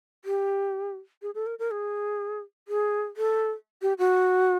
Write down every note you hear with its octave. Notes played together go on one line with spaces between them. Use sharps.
G4
G#4
A4
A#4
A#4
G#4
G#4
A4
G4
F#4